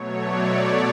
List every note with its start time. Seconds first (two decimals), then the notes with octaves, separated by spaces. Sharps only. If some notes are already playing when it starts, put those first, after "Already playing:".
Already playing: B2 F#3 A3 C#5
0.17 D5